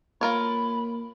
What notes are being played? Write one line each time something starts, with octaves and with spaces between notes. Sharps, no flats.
A#3 F4 A#4 C#5 B5